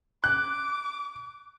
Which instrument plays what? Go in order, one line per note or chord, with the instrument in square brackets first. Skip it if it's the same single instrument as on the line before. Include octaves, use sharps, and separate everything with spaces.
[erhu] D6 [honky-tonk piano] F#6